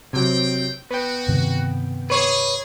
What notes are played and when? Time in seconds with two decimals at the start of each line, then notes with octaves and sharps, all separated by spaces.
0.13 C3 F#3 C4 G5
0.91 B3 F#4 G5
1.28 G2 C3 D#3
2.10 G#4 B4 C#5